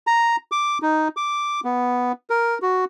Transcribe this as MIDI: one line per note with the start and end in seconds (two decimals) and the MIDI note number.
0.07 0.36 82
0.52 0.78 86
0.82 1.08 63
1.17 1.60 86
1.65 2.12 59
2.30 2.58 70
2.62 2.85 66